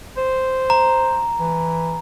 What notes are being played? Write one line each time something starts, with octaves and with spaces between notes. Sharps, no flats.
C5
A#5
E3